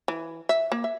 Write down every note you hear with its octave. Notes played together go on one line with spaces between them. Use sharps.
E3
E5
A#3
E5